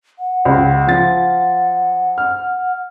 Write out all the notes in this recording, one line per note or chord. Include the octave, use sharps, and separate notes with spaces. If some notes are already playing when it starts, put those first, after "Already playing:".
F#5
C#2
F3 A6
F6